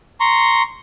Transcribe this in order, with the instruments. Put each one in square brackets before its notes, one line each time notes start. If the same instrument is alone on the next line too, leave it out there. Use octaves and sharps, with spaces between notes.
[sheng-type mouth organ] A#5 C6 C#6